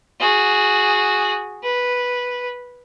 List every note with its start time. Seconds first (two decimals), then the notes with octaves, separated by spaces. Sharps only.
0.20 F#4 G#4
1.63 B4